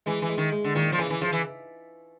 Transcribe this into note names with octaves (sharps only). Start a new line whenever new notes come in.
E3 G#3
E3
G#3
D#3
G#3
D3
A#2 D#3
F3
C#3 E3
E3
C#3 F3
E3